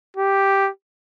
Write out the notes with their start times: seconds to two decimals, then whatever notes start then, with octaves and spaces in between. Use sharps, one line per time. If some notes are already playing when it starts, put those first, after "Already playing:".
0.17 G4